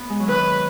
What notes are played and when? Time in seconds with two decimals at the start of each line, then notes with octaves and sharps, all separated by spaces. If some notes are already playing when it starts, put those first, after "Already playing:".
Already playing: B3
0.10 G#3
0.20 F#3
0.28 D#3 B4